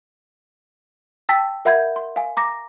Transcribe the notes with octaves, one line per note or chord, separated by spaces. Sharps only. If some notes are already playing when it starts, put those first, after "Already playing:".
G5 A5 E6 A6 B6
A#4 E5 F#5 B5 G6 G#6
C6
F5 G#5
A#5 D6 A#6